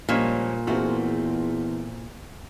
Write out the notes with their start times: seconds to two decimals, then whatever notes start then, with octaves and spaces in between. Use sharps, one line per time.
0.09 A#2 F3 G3 G#3 A#3 C#4 D4
0.67 E2 A3 A#3 C4 F4 F#4 G#4